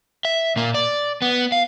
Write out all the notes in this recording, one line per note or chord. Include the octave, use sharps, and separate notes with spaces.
E5
A#2 A#3
D5
B3
F5